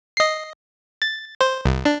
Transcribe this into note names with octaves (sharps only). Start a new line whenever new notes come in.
D#5 C7
A6
C5
C2
D4